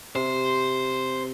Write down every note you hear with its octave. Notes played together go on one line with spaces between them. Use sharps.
C3 C5